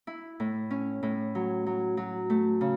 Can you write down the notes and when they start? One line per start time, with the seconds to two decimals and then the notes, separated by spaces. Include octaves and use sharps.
0.07 E4
0.40 A2
0.71 C#4
1.03 A2
1.35 F#3
1.66 F#3
1.97 F#3
2.30 A3
2.61 C#3